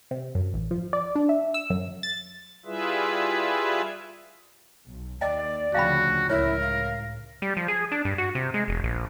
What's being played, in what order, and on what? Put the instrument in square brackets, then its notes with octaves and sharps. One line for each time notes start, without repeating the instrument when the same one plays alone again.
[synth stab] C3
F#2
A1
F3
D5
D4
E5
E6
F#2
A6
[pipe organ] G3 E4 F4 G#4 B4 E5
[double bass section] B1
[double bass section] D#2 [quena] D5 [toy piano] D#5 G5
[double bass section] D2 C#3 F3 [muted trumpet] F#4 [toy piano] F5 G5 B5
[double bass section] C#2 A2 [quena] E4 [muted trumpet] A#4 [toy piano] C#5
[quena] F5
[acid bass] G3
F3
G#4
D4
G2
F#4
C3
G#3
E1
A#1